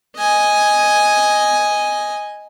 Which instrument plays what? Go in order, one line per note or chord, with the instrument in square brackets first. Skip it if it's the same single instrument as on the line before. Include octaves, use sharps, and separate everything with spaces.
[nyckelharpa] D#5 G#5